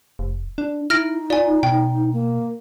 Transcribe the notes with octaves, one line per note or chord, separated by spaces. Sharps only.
F1
D4
D#4 E4 F6 A#6 D7
F4 D5 G#5
B2 G5
A#3